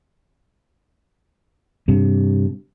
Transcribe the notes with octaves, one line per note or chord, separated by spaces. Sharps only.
G2 C3